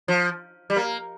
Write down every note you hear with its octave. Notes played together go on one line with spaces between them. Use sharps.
F3
G3
A#3